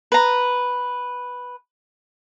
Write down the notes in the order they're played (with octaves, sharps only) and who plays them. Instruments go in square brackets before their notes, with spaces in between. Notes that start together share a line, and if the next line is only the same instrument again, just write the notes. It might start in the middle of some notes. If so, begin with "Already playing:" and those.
[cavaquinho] B4 A#5